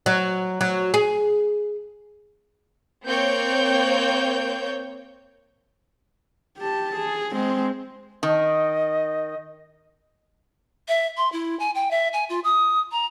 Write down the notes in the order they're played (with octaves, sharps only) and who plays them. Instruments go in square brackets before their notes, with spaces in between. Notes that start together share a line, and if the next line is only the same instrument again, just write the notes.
[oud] F#3
F#3
G#4
[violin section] A#3 C4 C#5 G5 G6
[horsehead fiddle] G4 A5
G#4
G#3 C4
[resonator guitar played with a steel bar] D#3 [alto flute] D#5
[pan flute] E5
C6
E4
G#5
G5
E5
G#5
F4
D#6
A#5